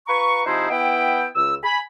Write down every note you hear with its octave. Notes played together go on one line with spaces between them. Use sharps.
F4 B4 A#5 C#6
C3 F3 D#4 E4 G#4 C5
B3 E4 G5
C#2 E6
G#5 B5